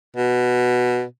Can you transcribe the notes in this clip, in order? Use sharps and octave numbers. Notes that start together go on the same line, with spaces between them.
B2